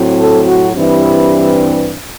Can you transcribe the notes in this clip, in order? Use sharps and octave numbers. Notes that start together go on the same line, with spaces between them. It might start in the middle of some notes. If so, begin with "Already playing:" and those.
Already playing: A2 F#3 C4
A4
F#4
G2 E3 G3 C4 E4